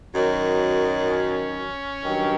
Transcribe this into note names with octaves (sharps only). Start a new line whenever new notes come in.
F#2 D#3 F#3
C#4
G2 D#3 F#3